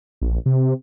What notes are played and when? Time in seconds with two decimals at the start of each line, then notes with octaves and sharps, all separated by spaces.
0.22 A#1
0.46 C3